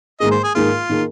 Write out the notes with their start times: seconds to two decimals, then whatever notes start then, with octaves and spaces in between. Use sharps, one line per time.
0.20 G#2 D#3 A#3 G#4 D#5
0.31 C5
0.44 G#4
0.55 G#2 D#3 A#3 F4 G#4
0.89 D#3 A#3 G#4